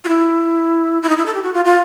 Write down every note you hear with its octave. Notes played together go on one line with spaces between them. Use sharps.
F4
E4
E4
D#4
E4
A4
G4
F#4
F4
F4